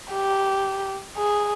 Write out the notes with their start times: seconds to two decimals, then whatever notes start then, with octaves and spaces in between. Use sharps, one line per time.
0.11 G4
1.17 G#4